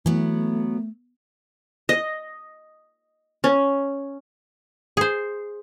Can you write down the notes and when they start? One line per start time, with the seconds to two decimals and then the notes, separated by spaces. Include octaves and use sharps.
0.06 E3 F#3 A3 B3
1.89 D#5
3.44 C#4
4.97 G#4 C5